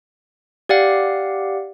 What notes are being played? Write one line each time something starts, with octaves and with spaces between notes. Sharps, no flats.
G4 D5 F5 F#5